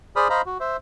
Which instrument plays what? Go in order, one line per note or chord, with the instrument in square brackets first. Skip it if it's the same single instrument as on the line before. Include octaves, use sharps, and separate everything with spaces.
[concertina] G#4 C5 D5 B5 D#6 F6
C5 D#5 F5 A#5 B5
F#4
C5 E5